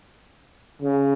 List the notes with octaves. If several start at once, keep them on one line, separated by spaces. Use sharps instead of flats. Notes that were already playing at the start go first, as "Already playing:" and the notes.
C#3